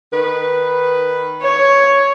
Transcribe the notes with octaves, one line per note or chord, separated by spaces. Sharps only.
D#3 B4
C#5